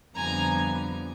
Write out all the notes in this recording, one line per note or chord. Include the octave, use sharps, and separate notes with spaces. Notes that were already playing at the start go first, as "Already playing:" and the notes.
F2 D3 G3 B3 G#5 A#5